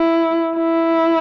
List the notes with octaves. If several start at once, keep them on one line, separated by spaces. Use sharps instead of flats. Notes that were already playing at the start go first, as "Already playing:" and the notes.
Already playing: E4
E4